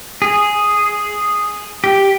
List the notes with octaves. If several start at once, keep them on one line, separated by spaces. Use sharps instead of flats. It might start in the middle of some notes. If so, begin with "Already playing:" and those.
G#4
G4